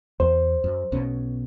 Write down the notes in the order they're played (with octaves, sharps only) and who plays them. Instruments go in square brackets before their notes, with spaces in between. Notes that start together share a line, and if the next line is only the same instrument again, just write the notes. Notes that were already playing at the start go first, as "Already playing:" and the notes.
[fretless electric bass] E2 [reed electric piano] C5
[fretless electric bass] F#2
B1 B2 C#4